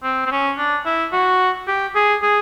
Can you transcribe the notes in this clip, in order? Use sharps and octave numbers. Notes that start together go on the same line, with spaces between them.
C4
C4
C#4
D4
E4
F#4
G4
G#4
G#4